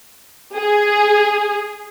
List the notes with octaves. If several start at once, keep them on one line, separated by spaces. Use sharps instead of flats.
G#4